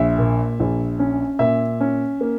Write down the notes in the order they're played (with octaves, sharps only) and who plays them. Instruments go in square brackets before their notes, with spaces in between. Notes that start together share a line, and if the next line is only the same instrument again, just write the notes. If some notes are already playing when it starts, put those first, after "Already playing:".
Already playing: [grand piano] A#1 E5
A#2
A#1
C#4
A#2 E5
C#4
A#3